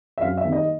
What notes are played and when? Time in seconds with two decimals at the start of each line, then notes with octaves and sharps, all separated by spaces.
0.18 E5
0.21 F#2 F5
0.38 E5
0.45 D#3 G3 A#3
0.52 D#5